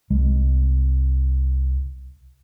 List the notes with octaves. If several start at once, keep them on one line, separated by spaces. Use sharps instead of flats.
C2 G#3